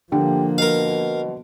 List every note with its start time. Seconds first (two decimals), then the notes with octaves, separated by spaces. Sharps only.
0.12 D3 F3 A#3 G4
0.58 B2 A#4 F5